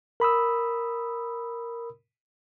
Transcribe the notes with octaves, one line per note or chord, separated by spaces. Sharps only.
A#4 B5 D#6 E6